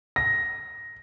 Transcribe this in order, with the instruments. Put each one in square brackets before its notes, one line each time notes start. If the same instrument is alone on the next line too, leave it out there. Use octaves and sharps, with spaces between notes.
[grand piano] A#6